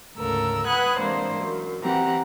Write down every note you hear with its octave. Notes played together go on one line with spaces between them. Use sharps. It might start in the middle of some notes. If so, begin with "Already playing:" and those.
D2 G#2 C#3 A4 A#4 E6
B4 F#5 B5 D#6 F#6 G#6
C3 E3 G#3 A#3 D4 C5
F#2
E3 C4 G4 F#5 A#5